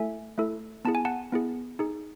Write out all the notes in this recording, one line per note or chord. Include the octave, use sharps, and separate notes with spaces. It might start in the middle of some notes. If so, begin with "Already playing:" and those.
Already playing: A3 E4 A4 E5 G#5
A3 E4 A4
B3 E4 G#4 A5
G#5
F#5 A5
B3 E4 G#4
D#4 G#4